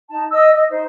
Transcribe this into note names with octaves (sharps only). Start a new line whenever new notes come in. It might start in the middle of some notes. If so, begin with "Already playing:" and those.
D#4 A5
D#5 E6
D#5
D#4 C5